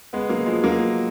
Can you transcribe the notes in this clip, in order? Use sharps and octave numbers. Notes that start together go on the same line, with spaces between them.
G#3 B3
F#3 A#3
F3 G#3
F#3 A#3